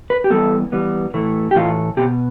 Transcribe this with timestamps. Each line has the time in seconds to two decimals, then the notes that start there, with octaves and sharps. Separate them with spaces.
0.10 B4
0.24 G4
0.30 E3 G3 B3 A4
0.72 E3 G3 B3
1.14 A2 E3 A3
1.51 G4
1.55 A2 E3 A3 F4
1.97 B2 B3 G4